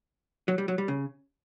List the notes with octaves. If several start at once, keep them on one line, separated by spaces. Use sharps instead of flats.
F#3
G3
F#3
G3
C#3